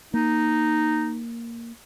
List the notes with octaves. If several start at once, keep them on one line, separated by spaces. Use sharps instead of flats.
A#3 D#4